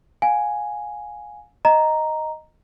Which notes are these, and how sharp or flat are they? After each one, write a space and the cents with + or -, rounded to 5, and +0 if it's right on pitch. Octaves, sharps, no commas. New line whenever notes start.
F5 +30 G#5 +0
D#5 +0 A#5 +0